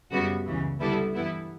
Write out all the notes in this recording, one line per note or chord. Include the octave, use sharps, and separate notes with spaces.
F#2 C#3 G3 B3 F#4
C#2 C#3 E3
D3 G3 B3 E4 A4
G2 E3 B3 E4